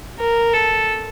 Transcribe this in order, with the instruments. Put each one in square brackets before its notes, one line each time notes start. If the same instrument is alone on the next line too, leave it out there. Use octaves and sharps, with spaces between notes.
[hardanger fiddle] A#4
A4